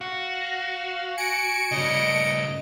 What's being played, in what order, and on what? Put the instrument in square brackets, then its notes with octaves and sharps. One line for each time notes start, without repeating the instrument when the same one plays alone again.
[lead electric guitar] F#4 [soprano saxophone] F5
[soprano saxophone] G#5 [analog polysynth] C#7 D7
[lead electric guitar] G2 C#3 [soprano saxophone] D#5